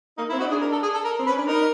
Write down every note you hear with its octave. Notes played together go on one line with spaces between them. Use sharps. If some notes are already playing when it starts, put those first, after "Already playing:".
A#3 D#4
E4
C4
D#4 F#4
D4 G#4
A#4
A4
G#4
A4
A#4
C4
C#4 B4
D4
D#4 A#4